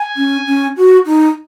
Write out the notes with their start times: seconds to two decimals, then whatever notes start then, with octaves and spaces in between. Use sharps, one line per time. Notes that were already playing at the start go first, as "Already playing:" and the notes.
Already playing: G#5
0.17 C#4
0.47 C#4
0.77 F#4
1.06 D#4